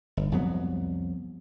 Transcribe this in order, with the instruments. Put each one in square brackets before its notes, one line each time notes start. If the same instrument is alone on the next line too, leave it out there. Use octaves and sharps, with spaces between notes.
[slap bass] G1
C2 F2 F#3 B3